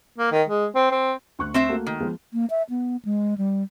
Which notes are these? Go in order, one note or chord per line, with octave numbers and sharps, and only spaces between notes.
A#3
D#3
G#3
C4
C4
D2 C#6 F#6
C4 C5 E5
A3 A#3 F#4
D#3
F3 G#3 B3
A#3
E5
B3
G#3
G3